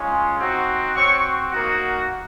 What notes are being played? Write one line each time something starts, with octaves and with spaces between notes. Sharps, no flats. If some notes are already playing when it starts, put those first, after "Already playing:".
Already playing: G#3 C#4 F4
C4 D#4 F#4
C4 F#4 C#5 C#6
A#3 D#4 F#4